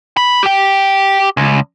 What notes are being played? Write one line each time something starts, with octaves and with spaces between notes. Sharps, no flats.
B5
G4 G5
C#2